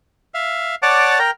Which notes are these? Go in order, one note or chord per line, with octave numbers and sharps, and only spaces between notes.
E5 F5
C#5 D5 F#5 A5 D6
A#4 G5 A#5